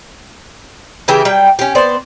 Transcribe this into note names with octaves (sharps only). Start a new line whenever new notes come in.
C#3 E3 G4 E5
F#3 G3 G5
C#4 G4
B3 C5 D5